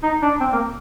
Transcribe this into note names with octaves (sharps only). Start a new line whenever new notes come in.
D#4
D4
C4
A#3